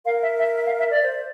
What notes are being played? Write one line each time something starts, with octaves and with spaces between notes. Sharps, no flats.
A#4 F5
E5
E5
E5
F5
E5
D5
C5